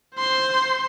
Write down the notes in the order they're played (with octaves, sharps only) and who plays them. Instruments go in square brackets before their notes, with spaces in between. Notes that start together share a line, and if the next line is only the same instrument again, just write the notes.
[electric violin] C5 C6